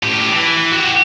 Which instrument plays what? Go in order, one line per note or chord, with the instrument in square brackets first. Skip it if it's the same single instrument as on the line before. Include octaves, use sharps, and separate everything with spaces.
[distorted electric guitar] A2 G4
E3
F#4 G4